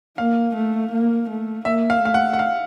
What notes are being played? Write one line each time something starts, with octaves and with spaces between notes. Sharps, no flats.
A#3 F5
A3
A#3
A3
A#3 E5
F5
A3 F5
F#5
F#5
F5